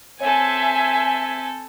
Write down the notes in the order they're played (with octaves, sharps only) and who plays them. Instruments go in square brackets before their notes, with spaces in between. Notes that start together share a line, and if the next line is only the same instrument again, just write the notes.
[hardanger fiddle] C4 A4 [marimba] C#5 [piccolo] E5 [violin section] G#5